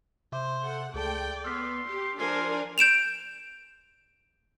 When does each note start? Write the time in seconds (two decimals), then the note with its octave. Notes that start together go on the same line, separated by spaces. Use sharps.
0.32 C3 C5 E5 D6
0.64 A4 F#5
0.94 C#2 A3 G#4 D5 G5 A5
1.44 B3 C6 E6 F6 B6
1.88 G4
2.20 F3 D4 A#4 G#5 C6
2.78 G6 D7 E7 F7